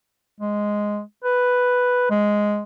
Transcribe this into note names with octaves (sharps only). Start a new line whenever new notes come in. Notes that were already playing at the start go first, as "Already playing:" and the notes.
G#3
B4
G#3